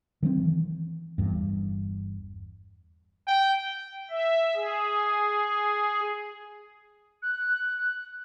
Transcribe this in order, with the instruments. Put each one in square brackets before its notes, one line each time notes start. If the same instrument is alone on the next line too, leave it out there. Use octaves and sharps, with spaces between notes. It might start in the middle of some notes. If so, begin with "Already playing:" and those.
[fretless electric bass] D#3 F#3 A3 C4
E3
G1 E2 G2
[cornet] G5
[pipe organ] E5
G#4
[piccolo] F#6